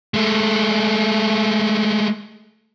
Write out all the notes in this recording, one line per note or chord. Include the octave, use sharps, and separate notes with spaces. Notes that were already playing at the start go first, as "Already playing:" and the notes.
G#3 A3